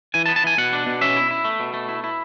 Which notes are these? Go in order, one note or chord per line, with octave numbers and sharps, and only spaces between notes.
E3 G#5
A5
B3
A5
E3 G#5
B2 F#5
D4
B2
C#4 E5
E4
E4
A3
B2
A3
E4
E4